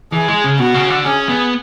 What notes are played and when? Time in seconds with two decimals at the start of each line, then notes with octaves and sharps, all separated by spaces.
0.12 E3 G#4
0.28 G#3
0.44 C#3
0.59 B2 F#4
0.74 C#3
0.90 D3
1.05 C#4 G#4
1.29 B3